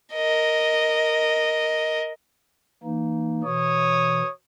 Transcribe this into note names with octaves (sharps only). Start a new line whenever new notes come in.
A#4 D#5
E3 A#3 D#4
B2 E3 C#5 D#6